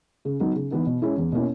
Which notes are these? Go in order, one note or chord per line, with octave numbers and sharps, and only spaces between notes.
C#3
F#3 B3 D#4
C#3
E3 B3 D#4
B2
G#3 C#4 E4
E2
B2 A#3 C#4 E4